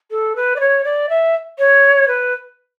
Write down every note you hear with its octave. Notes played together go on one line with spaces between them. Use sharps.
A4
B4
D5
C#5
D5
E5
C#5
B4